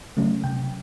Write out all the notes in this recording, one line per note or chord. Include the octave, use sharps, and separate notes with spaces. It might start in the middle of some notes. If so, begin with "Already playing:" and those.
C#3 F#3 A3 C#4
C3 G5